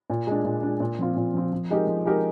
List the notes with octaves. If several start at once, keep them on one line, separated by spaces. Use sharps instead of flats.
A#2
G#3 D4
A#2
G#3 D4
A#2
F3 C4 F4
A#2
F3 C4 F4
F3
G#3 D#4 G4 A#4
F3
G#3 D#4 G4 A#4